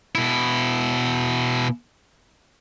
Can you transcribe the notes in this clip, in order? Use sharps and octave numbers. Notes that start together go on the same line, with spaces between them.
B2 E4